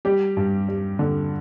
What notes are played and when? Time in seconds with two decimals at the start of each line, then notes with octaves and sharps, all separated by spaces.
0.05 G3 G4
0.37 G2
0.68 G3
0.99 D3